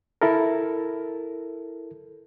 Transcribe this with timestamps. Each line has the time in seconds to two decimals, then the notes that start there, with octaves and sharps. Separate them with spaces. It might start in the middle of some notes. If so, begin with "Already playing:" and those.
0.21 E4 A4 A#4